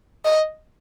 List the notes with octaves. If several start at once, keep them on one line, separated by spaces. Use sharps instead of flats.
D#5